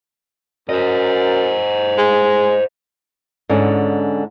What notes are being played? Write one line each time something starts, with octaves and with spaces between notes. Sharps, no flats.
F#2 C5 D#5
G#3
G#2 D3 C#4